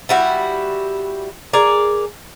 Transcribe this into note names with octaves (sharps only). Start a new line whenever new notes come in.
G3 E4 F#4
G#4 A#4 D5